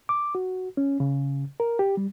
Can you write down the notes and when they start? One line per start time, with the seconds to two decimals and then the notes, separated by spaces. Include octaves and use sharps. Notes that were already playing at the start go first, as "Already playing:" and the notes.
0.09 D6
0.35 F#4
0.77 C#4
1.00 C#3
1.60 A#4
1.79 G4
1.97 G3